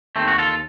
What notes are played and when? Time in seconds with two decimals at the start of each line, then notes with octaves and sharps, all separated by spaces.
0.16 D#2 A3 C4
0.28 F#4
0.38 F4 A4